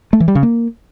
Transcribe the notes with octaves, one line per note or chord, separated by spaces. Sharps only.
A3
E3
G3
C#3
A#3